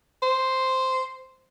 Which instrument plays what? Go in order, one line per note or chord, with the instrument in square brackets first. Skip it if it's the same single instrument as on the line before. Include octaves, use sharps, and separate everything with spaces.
[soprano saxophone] C5